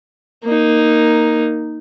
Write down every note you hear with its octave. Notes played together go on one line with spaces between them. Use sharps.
A#3 D#4